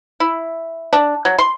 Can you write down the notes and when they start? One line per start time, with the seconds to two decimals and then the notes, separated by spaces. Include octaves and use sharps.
0.20 E4
0.93 D4
1.25 F#3
1.38 C6